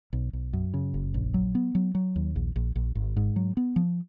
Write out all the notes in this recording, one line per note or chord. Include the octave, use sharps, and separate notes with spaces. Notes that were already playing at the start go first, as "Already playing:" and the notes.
B1
B1
F#2
C#3
F#1
A#1
F#3
B3
F#3
F#3
D#2
A#1
A#1
A#1
G#1
G#2
F#3
B3
F3